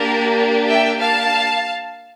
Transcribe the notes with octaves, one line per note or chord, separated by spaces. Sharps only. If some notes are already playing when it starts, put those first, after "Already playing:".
Already playing: A#3 D4 G4 A#4
E5 G5
F5 A5